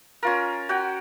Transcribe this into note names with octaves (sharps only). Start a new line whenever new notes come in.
C#4 F4 A#4
F#4 F#5 G5